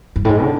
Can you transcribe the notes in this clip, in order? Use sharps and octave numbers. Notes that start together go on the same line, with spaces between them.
G2
A2
G#2
D3